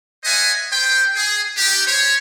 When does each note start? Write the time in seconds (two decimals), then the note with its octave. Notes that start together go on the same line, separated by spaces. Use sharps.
0.24 C5 D#5 E5 F#5 G#5
0.70 B3 C5 G5
1.15 G#4
1.56 D4 D#4 G4
1.87 C5 C#5